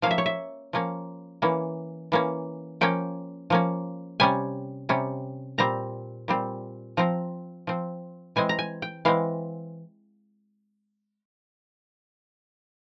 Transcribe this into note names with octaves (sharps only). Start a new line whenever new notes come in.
F3 A#3 C#4 F5
E5
C#5
E5
F3 A#3 C#4
E3 A#3 C#4
E3 A#3 C#4
F3 A#3 C#4 G5
F3 A#3 C#4
C3 G3 C#4 G#5
C3 G3 C#4
A#2 G3 C4 A#5
A#2 G3 C4
F3 C4 A#5
F3 C4
E3 G#3 C4 G#5
A#5
G#5
G5
E3 G#3 C4 F5